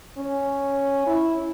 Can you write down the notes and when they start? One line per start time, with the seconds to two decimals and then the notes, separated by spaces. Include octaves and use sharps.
0.18 C#4
1.07 E4